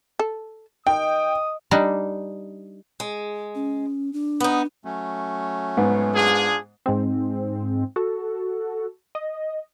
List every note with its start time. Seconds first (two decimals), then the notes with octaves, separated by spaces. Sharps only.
0.19 A4
0.87 D#3 D#5 G5 D#6
1.71 G3 D4 D#4
3.00 G#3
3.55 C#4
4.13 D4
4.40 B3 D#4
4.85 F#3 A3 C#4
5.77 G#2 B3
6.14 D4 F4 G#4
6.86 G#2 G#3 C4
7.96 F#4 A4
9.15 D#5